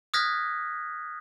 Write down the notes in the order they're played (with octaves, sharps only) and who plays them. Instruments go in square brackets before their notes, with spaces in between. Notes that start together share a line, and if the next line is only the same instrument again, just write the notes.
[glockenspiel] D#6 F6 F#6 G#6 A#6 B6